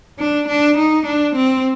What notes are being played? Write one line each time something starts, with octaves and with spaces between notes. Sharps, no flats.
D4
D4
D#4
D4
C4